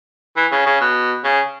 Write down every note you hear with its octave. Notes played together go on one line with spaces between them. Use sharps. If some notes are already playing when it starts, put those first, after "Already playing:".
E3
C#3
C#3
B2
C#3